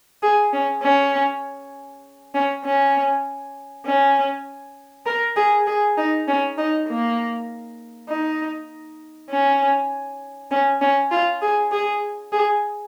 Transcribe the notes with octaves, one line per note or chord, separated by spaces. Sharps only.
G#4
C#4
C#4
C#4
C#4
C#4
A#4
G#4
G#4
D#4
C#4
D#4
A#3
D#4
C#4
C#4
C#4
F4
G#4
G#4
G#4